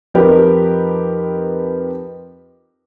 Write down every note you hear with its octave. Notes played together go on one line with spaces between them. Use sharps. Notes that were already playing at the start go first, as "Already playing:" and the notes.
F2 F3 D#4 G4 A#4 B4